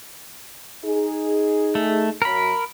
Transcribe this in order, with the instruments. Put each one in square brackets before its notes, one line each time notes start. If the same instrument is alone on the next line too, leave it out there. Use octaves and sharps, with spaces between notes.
[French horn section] D#4 G#4
[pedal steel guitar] A3
[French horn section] F#2 [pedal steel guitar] A#4 B5